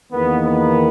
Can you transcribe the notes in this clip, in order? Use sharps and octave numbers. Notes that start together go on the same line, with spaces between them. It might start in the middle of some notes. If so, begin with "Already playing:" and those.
E2 D#3 A#3 B3
B3